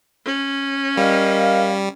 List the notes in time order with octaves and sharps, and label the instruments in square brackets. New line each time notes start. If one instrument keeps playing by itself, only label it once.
[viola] C#4
[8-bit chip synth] G3 [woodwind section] A#4 D#5 F5